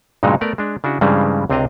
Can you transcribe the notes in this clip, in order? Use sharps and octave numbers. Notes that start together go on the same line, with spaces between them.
G2 A#2 C#3 F#3 G#3 D#4
A3 B3 A#4 D5
G#3 D4
C#3 D4 E4 F#4
G2 C#3 E3 G3 G#3 C4
C#2 C3 C4 D4 D#5 A#5